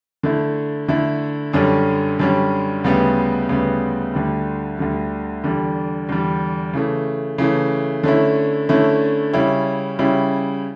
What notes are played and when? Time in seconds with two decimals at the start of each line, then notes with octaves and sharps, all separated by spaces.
0.23 D3 A3 E4
0.88 D3 A3 E4
1.53 F#2 D3 G3 C#4
2.19 F#2 D3 G3 C#4
2.84 D2 C#3 G3 B3
3.48 D2 C#3 G3 B3
4.14 D2 D3 G3
4.78 D2 D3 G3
5.44 E2 D3 G3
6.09 E2 D3 G3
6.73 C#3 E3 A3
7.38 C#3 E3 A3
8.03 D3 A3 C#4 E4
8.69 D3 A3 C#4 E4
9.33 C#3 G3 C#4 E4
9.99 C#3 G3 C#4 E4